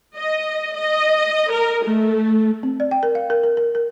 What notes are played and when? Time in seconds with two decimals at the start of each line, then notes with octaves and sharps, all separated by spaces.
0.17 D#5
0.74 D#5
1.50 A#4
1.85 A3
2.63 C4
2.80 D5
2.91 G5
3.03 A#4
3.15 F5
3.30 A#4
3.43 A#4
3.57 A#4
3.75 A#4